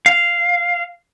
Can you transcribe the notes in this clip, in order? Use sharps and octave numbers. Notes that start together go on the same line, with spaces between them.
F5